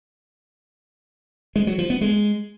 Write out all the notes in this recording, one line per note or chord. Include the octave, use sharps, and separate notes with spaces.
G#3
F#3
F3
B3
G#3